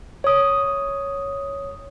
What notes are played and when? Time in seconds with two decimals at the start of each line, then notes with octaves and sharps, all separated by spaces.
0.24 C#5 D#6